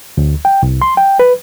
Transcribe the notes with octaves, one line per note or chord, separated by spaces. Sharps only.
D2
G5
C2
C6
G5
B4